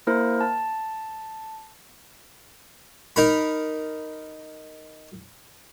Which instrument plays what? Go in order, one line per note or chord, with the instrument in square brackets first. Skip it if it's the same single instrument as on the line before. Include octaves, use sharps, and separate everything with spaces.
[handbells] A#3 E4 A#4 C5
A5
[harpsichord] D#4 A#4 B5